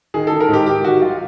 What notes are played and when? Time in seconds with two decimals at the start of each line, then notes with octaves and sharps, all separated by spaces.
0.14 D#3 G#4
0.27 A4
0.32 D#3
0.40 A#4
0.49 G#2 G4
0.66 D#3 G4
0.84 D#3 F#4
1.01 F#3 F4